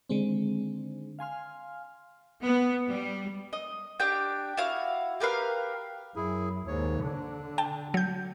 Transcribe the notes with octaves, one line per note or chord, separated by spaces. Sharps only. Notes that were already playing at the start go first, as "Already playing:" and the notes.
D3 D#3 G#3 C4
F5 G#5 C6 F6
B3
G3
D#5
D4 G4 G5
E4 F#4 F5
G4 A#4 B4 F5
F#2 E4 G#4
D#2 G#2 C#5
D3 D4
G5 A5
F#3 G6